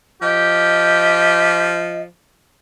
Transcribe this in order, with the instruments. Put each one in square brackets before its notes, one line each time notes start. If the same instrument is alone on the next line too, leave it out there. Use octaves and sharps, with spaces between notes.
[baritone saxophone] F3 [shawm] G4 [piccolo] D#5